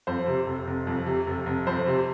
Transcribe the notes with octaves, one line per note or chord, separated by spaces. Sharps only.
F2 C5
C3
F1
F1
F2
C3
F1
F1
F2 C5
C3